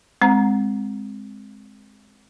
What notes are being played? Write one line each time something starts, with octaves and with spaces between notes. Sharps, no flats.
G#3 C4 A#5